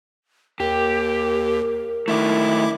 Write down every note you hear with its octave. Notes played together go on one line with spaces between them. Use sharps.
D#2 G4 A#4
D#3 A3 E4 E5 D6